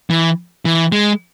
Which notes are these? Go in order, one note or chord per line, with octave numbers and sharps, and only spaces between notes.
E3
E3
G#3